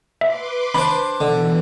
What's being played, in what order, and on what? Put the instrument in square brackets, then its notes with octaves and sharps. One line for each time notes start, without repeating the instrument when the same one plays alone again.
[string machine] B4 C6 D6 [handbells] E5
[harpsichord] D4 C5 [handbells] B5
[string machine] B2 E3 [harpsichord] D3